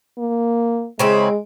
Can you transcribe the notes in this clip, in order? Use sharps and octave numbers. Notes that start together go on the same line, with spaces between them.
A#3
C#3 G#3 C4 E4